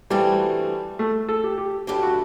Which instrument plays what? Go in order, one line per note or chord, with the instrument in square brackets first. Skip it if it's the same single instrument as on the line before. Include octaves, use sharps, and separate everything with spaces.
[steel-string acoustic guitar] G2 E3 A3 C4 F#4 [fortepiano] G3
[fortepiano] A3
A4
G4
G4
[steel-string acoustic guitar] G2 D3 F#3 A3 E4 [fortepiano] G4
[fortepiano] F#4